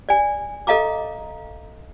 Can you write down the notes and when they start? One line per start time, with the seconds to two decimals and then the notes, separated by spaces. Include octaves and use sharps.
0.09 D5 G#5
0.67 A4 D#5 F5 A#5 D6